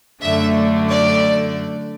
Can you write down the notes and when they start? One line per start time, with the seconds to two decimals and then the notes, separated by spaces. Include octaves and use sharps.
0.21 F#2 D3 A3 D4 E5
0.90 D5